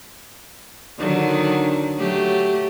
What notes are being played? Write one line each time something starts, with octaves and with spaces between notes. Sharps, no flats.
D3 D#3 F#3
F#3 A3 G4